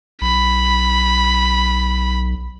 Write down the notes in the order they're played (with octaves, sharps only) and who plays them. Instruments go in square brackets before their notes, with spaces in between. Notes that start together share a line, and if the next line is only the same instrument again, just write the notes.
[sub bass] B1 [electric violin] B5